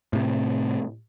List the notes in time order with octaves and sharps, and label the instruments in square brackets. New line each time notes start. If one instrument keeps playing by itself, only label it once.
[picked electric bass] A2 C3